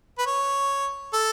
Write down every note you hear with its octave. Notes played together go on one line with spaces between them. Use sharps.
B4
C#5
A4